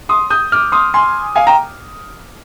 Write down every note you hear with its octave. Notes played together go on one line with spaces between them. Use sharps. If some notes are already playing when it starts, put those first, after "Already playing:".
C6 D#6
D#6 G6
D6 F6
C6 D#6
G#5 C6
F5 G#5
G5 A#5